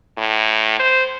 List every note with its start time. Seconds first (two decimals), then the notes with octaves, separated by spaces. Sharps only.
0.18 A2
0.79 C5